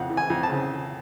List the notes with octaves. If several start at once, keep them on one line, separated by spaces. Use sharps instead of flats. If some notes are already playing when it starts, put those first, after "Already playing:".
Already playing: F2 C#3 F5 F#5
E3
G#5
F2
A5
C#3